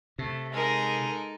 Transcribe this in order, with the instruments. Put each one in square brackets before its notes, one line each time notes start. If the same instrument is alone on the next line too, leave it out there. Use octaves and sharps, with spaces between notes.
[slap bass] C3 [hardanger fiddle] A3
[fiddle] G#3 A#4 [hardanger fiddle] D#4 A4